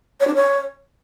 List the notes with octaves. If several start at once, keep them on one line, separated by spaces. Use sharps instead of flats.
C#5
D4
C#5